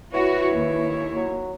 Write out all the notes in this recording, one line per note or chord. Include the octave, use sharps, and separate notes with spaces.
E3 E4 F#4 C#5
D#2
F#3